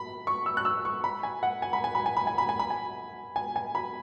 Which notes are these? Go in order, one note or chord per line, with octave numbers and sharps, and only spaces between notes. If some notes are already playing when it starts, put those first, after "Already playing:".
Already playing: B5
C#6
E6
F#6
E6
C#6
B5
G#5
F#5
G#5
B5
G#5
B5
G#5
B5
G#5
B5
G#5
B5
G#5
G#5
G#5
B5